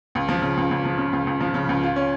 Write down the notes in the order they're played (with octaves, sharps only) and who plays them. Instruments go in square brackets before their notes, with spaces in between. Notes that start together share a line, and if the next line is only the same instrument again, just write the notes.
[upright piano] C#2
F3
C#3
C#2
C#2
F3
C#3
C#2
C#2
F3
C#3
C#2
F4
C#4